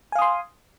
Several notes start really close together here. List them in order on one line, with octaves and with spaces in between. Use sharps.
G#5 F5 D#6 C6